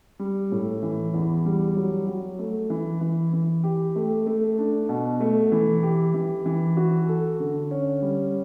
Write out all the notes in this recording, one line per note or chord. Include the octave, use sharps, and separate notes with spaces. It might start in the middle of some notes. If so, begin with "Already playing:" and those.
G3
A2
E3
E2
G3
F#3
F#3
A3
E3
E3
E3
G4
A3
A3
D4
B2
A3
E3
G4
E3
E3
F#4
A4
D3
C#4
G3